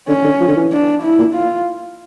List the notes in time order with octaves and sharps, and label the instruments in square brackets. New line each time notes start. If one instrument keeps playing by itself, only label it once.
[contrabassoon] D3 [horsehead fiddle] C#4
[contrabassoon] D3
F3
D3
E3
[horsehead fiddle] D4
E4
[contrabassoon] A#2
[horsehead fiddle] F4